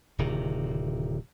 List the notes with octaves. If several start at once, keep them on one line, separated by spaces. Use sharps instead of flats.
D1 C3 D#3